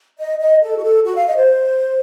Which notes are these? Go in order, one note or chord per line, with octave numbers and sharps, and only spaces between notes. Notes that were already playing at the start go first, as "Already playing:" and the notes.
D#5
D#5
A4
F#4
A4
F#4
F5
D#5
C5